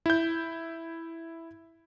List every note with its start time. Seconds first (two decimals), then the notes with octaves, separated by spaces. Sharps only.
0.06 E4 G6